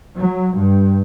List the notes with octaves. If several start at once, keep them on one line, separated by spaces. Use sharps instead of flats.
F#3
G2